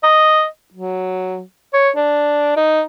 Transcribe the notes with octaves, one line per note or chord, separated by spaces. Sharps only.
D#5
F#3
C#5
D4
D#4